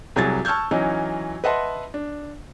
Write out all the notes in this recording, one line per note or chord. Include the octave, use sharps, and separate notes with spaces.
C2 F#3 G#4 G#6 A6
A5 C#6 E6 F6 G6 G#6
E3 F#3 C#4 D#4
B4 D#5 E5 F#5 A5 C6
D4